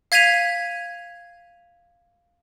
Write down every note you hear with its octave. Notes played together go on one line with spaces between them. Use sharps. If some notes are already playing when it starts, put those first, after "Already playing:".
F5 G#6 B6 D#7 F7